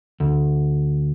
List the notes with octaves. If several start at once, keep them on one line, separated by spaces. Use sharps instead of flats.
D2